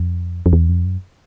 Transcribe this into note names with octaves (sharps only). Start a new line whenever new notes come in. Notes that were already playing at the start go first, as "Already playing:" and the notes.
Already playing: F2
F2
E2
F2
F#2